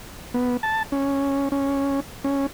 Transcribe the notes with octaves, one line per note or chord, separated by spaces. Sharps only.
B3
A5
C#4
C#4
C#4